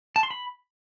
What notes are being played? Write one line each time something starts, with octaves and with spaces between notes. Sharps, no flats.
A5
C6
B5